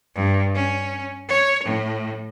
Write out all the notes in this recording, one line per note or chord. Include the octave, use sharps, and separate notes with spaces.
G2
C#4
C#5
A2